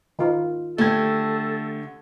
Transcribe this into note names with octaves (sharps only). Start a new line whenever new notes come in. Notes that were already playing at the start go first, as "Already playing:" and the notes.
D#3 F4
D3 A3 G4 A4 G#6